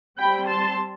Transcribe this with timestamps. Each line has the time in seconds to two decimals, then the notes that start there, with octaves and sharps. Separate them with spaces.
0.19 G3 C4 G5 B5
0.47 A5 C6